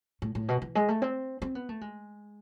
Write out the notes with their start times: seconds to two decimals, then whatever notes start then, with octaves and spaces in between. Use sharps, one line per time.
0.22 A2
0.35 A2
0.48 B2
0.62 E3
0.75 G#3
0.88 A3
1.02 C4
1.42 C4
1.55 B3
1.69 A3
1.81 G#3